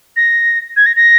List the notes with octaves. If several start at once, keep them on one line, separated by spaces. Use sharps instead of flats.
A#6
G#6
A#6
A#6